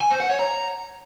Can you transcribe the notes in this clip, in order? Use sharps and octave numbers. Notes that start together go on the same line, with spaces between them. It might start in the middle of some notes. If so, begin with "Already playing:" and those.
G#5
C5
F#5
C#5
A#5